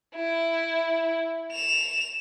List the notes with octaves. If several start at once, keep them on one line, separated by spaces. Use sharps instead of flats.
E4
E7 F7